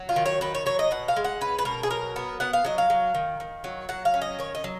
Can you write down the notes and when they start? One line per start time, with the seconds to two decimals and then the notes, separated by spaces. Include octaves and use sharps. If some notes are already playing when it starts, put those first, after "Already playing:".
Already playing: F#3
0.09 F4
0.16 D#3
0.26 C#5
0.41 D#3 B4
0.55 C#5
0.66 F#3 C#5
0.79 D#5
0.91 B2 F#5
1.08 F5
1.16 G#3
1.24 F#5
1.41 C#4 B4
1.59 B4
1.65 B2 A#4
1.83 G#4
1.91 F#3 A#4
2.16 B3
2.40 B3 F#5
2.53 F5
2.65 F#3 D#5
2.78 F5
2.90 F#3
3.15 D#3
3.40 D#3
3.64 F#3
3.89 F#3 F#5
4.05 F5
4.14 C#4
4.22 D#5
4.39 D#3 C#5
4.55 D#5
4.64 F#3